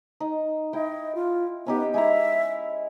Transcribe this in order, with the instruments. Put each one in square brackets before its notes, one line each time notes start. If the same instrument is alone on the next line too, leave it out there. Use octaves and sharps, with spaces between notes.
[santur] D#4
[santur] E4 G5 [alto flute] D#5
[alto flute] F4
[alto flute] B3 [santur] C#4 D#4 G4
[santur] G#3 E4 A#5 [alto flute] E5